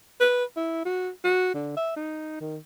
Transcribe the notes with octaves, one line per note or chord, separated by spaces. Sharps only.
B4
E4
F#4
F#4
D3
E5
D#4
D#3